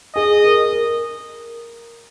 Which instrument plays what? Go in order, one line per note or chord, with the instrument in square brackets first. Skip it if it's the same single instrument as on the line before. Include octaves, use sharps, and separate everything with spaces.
[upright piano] G#4 [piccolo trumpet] D#5
[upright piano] A#4
A#4